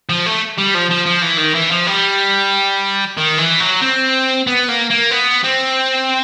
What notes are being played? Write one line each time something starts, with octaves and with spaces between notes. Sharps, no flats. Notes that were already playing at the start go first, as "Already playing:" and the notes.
F3
A3
G3
F3
F3
F3
E3
D#3
E3
F3
G3
D#3
E3
F#3
C4
B3
A#3
A#3
B3
C4